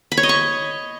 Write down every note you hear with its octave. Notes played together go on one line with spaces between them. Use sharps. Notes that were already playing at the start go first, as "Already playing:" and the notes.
B5
C#5
D#5
C#6